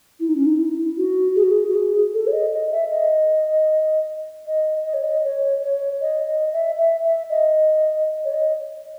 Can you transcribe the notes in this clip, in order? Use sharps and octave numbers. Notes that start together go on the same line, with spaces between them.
E4
D#4
C#4
D#4
E4
F#4
G#4
F#4
G#4
F#4
G#4
A4
C#5
D#5
D#5
E5
D#5
D#5
D#5
C#5
D#5
C#5
C#5
D#5
D#5
E5
E5
E5
D#5
C#5
D#5